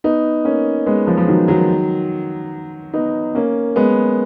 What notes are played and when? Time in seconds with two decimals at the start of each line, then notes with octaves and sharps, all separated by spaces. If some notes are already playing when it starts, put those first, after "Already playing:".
0.04 B3 D#4
0.44 A#3 C#4
0.86 G#3 B3
1.07 F3
1.17 F3
1.28 D#3 F#3
1.48 D#3 F#3
2.93 B3 D#4
3.35 A#3 C#4
3.76 G#3 B3